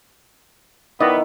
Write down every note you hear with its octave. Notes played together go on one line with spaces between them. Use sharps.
D#3 B3 E4 D5 D#5